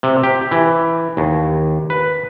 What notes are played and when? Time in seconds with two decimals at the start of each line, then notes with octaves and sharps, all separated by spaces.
0.03 C3
0.23 G4
0.51 E3
1.17 D#2
1.90 B4